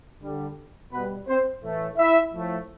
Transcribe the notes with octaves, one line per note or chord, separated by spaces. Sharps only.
D3 G3
B2 G3 B3 B4
C4 C5
A2 E3 A3
E4 E5
A2 F3 A3